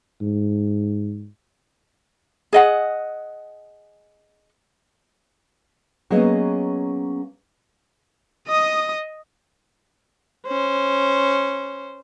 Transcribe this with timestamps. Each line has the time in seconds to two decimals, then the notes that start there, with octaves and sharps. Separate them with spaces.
0.21 G#2
2.53 G#4 D#5 F#5
6.10 F#3 A#3 B3 C#4 G#4 D#5
8.48 D#5 D#6
10.47 C#4 C5